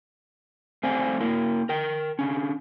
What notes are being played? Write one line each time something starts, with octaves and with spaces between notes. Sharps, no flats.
A3 C4 C5 D5 F5 G#5
A#3 E4 A#4
A#4 G5
D3 C#4